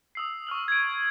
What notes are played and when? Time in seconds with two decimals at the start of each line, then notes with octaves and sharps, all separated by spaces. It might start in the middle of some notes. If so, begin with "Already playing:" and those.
0.15 D#6 E6 C7
0.47 C#6 D#6 F6 F#7
0.68 G#6 D7